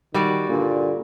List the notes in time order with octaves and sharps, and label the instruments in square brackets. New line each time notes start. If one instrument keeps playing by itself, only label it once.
[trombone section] D#3 [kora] G3 F#4 D5
[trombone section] G2 A#2 D3